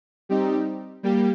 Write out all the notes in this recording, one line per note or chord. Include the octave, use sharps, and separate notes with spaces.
G3 C4 D#4 G4
G3 A#3 G4